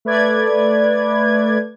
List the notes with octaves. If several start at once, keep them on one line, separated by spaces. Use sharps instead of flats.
A3 B4 D5 G#6